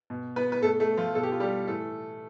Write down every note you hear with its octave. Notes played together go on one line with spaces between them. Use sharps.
B2
B3 B4
B4
B2 A3 A4
A3 A4
F3 F4
B2 A4
G4
F4
G3 G4
A2 E3 A3 A4